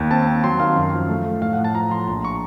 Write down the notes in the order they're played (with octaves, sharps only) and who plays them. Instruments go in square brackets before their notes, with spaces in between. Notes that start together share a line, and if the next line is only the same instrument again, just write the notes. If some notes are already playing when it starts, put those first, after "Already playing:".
Already playing: [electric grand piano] D#2
C4 A5
C4
F#3 C6
D#3 F5
F#2
F3
A3
A3
A2 F5
F#5
A2
A5
F3 A#5
F3 C6
A#1 A#5
C#6